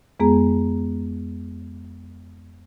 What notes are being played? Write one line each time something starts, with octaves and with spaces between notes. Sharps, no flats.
F2 G#3 B3 G#4 A#5